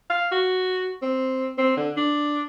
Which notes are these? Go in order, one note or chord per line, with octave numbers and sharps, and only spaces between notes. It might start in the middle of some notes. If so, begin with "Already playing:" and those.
F5
F#4
C4
C4
D3
D4